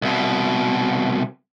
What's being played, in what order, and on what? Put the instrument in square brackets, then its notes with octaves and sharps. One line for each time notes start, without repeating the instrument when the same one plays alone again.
[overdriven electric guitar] C2 B2